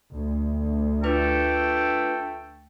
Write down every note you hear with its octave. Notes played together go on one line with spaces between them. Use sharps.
D2
A3 D4 F4 A4 B4 G5